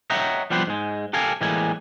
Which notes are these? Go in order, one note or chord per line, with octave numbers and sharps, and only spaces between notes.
C#5 D#5 E5 F#5 G5 A#5
F3 G3 B3 G4 B4 C5
G#2 G#3
G4 A4 A#4 F5 G#5
A2 E3 G3 G#3 A#3 G#5